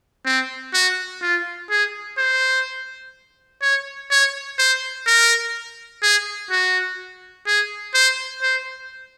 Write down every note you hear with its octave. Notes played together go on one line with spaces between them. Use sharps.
C4
F#4
F4
G#4
C5
C#5
C#5
C5
A#4
G#4
F#4
G#4
C5
C5